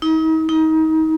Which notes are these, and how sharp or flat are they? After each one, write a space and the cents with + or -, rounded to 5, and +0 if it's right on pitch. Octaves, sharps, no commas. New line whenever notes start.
D#4 +40
D#4 +30